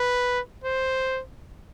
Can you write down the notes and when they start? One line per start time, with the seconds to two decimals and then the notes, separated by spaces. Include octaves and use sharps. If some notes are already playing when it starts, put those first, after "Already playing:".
Already playing: B4
0.64 C5